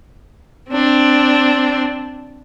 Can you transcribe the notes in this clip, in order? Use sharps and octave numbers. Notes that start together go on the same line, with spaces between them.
C4 D4